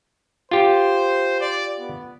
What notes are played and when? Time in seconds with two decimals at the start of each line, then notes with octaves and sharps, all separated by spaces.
0.51 F4 G4 C5
1.40 D5
1.79 B3